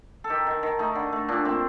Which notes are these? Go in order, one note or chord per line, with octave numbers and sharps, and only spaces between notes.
A4
D#3 G4
D#3
D#3
A3 D#4
D3
A3
A#2 D4
A3 C4